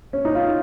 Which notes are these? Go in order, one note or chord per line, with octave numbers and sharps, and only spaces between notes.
C#4
D#4
F4